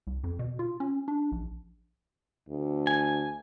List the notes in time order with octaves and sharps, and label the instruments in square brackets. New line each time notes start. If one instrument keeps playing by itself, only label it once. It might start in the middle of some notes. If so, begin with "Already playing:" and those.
[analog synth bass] C2
F2
B2
F4
C#4
D4
A#1
[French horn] D2
[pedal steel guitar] G#5